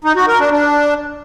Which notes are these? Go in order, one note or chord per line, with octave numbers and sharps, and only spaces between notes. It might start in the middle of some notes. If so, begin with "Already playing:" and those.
D#4
F#4
A#4
D4
D4